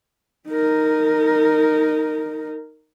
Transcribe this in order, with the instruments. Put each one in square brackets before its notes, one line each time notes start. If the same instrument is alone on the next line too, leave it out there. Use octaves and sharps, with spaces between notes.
[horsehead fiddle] D#4 A#4